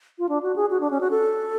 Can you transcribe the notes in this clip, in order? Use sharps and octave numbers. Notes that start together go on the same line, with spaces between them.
F4
D4
F#4
G#4
F#4
D4
C#4
F#4
A4